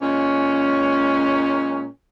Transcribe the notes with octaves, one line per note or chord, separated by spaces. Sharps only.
A#2 G#3 C#4